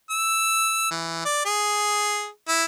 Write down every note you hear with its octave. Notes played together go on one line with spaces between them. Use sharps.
E6
E3
D5
G#4
E4